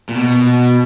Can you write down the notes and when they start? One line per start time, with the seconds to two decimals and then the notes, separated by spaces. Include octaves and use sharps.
0.09 A#2
0.15 B2